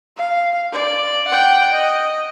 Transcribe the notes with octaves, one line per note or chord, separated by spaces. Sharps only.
F5
D5
F#5 G5
D#5